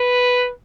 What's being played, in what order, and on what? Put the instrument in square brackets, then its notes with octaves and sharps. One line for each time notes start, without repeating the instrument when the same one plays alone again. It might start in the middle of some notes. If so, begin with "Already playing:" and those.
Already playing: [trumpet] B4